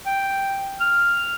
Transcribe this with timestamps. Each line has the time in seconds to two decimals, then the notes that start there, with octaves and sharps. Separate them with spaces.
0.06 G5
0.80 F6